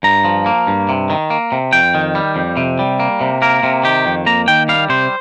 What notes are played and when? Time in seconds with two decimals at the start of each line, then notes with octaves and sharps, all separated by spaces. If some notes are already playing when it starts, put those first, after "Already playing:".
0.03 G2 A#5
0.25 F3
0.46 A#3
0.67 G2
0.89 C3
1.10 D#3
1.30 A#3
1.52 C3
1.73 F2 G5
1.95 D#3
2.15 G3
2.36 F2
2.57 C3
2.79 G3
3.00 A#3
3.21 C3
3.42 A#3 A#4
3.63 C3
3.84 D#3 G4
4.06 F2
4.26 A#3 A#5
4.48 D#3 G5
4.69 G3 F5
4.89 C3 C5